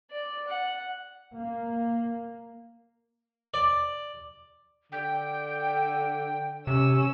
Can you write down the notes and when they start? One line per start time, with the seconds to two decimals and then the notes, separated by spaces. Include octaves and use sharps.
0.11 D5
0.47 F#5
1.34 A#3
3.54 D5
4.92 D3 G5
6.67 C3 C#4 E6